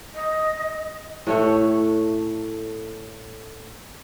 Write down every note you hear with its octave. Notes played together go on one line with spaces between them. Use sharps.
D#5
A2 A3 C#5